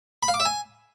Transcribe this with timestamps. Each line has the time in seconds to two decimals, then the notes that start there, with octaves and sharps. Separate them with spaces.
0.23 B5
0.28 F5
0.34 D6
0.40 E5
0.45 G#5